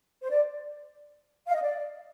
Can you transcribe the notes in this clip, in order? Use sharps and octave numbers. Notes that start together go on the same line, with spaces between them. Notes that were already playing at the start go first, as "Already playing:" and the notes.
C5
D5
F5
D#5
D5